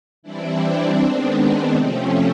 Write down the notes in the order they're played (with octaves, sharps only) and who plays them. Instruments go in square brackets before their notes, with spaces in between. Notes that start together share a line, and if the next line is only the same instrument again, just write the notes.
[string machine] E3 G3 C4 D4 E4
C4 D4
D#3 G#3 B3 C4 D4
C4
C3 F3 A3 C4 C#4